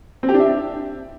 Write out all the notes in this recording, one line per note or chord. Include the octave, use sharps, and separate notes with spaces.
C4
G4
D4
E5